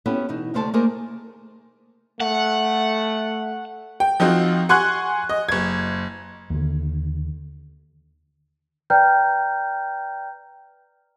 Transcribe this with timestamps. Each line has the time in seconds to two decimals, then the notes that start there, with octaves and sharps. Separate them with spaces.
0.06 B3 C#4 E4 F#4 G4 A4
0.29 B2 E3 D#4
0.54 D2 C3 A3 C5 G5 A5
0.73 A3 A#3 D#4 G#4 A#4 C5
2.20 A3 F#5
4.00 G5
4.20 F3 C4 D#4 F4 F#4
4.69 F#5 G#5 C6 C#6 F#6 G#6
5.29 D#5
5.49 F#1 G#6
6.50 D#2 D3
8.90 B4 D5 G5 A#5 F6 G6